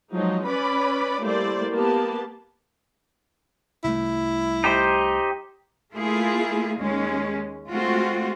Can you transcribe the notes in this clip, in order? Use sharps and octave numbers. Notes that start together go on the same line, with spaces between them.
F3 F#3 G#3 D#4
C#4 B4 D5 B5
G3 A3 A#3 E4 C5 D5
A#3 B3 G4 A5
C2 G3 A3 E4
D#4 G4 C5
A3 A#3 E4 F4 G#4
D#2 G#3 C#4
G#3 A3 C4 F4 F#4